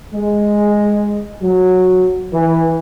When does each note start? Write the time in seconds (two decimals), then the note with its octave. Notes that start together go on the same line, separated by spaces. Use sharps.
0.13 G#3
1.42 F#3
2.33 E3